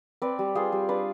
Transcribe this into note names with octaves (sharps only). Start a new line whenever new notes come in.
C4 B4 D5
G3
F4 G#4 C5
G3
D4 B4 D5